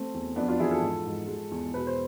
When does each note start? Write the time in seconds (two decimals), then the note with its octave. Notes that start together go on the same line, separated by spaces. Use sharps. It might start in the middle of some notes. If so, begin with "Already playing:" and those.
Already playing: A3 C4
0.14 E2
0.36 F2 B3 D4
0.48 D4 F4
0.59 E3 E4 G#4
0.71 F4 A4
0.82 G#2
1.06 G#2
1.28 G#3
1.51 E2
1.74 B2 B4
1.87 C5